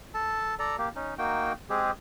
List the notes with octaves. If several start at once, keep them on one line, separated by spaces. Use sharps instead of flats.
A4 A5
A4 D5 A#5
A#3 G4
C#4 D#4
A#3 D#4 F#4 G5
G#3 C4 G4 G#4